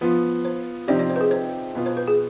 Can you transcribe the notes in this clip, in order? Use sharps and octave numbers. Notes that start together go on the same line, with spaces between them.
F3 B3 F4
C5
C3 F3 C4 D#4 G4 D5
D5
C5
B4
G#4
C5
B2 B3 F4
C5
B4
G#4